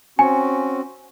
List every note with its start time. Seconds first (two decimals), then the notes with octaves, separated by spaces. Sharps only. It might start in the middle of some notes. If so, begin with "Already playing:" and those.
0.19 C4 C#4 F#4 G#5